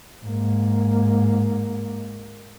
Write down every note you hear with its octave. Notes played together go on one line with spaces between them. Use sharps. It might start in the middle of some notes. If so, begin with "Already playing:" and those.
G#2 A#3